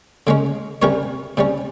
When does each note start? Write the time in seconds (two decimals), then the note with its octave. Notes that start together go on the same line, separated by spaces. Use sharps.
0.27 C#3 G#3 C#4
0.82 C3 G3 C#4 A#4 C#5
1.37 C3 G3 C#4